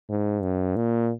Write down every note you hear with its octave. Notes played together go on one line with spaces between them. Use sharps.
G#2
F#2
A#2